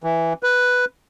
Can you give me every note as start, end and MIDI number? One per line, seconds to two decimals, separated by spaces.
0.04 0.33 52
0.43 0.85 71